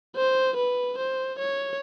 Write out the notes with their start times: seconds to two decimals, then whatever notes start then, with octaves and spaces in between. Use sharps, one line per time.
0.16 C5
0.57 B4
0.98 C5
1.39 C#5